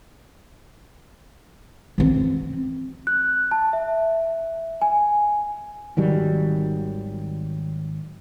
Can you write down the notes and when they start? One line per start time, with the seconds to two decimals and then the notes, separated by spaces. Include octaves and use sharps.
1.98 E3 C4
3.07 F#6
3.51 A5
3.73 E5
4.82 G#5
5.97 G#1 D#3 F#3 G3